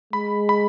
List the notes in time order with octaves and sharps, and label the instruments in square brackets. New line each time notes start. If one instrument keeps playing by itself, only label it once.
[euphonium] G#3 [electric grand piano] B5
[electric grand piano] B5